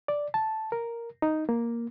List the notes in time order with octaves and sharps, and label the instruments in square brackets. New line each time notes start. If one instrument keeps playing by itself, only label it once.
[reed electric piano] D5
A5
A#4
D#4
A#3